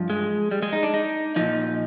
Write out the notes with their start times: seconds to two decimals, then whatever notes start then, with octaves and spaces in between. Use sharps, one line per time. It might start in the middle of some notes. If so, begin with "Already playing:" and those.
Already playing: G2 F3
0.10 G#3
0.51 G3
0.62 G#3
0.73 D#4
0.83 D4
0.94 D#4
1.36 A#2 F3 D#4